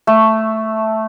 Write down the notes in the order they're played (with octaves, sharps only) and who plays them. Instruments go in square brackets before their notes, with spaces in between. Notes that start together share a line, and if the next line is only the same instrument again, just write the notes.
[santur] A3